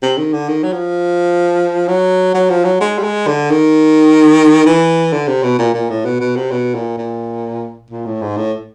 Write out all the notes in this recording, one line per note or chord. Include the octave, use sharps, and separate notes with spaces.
C3
D#3
D3
D#3
F#3
F3
F#3
F#3
F3
F#3
G#3
G3
G#3
D3
D#3
E3
D3
C3
B2
A#2
A#2
A2
B2
B2
C3
B2
A#2
A#2
A#2
A2
G#2
A2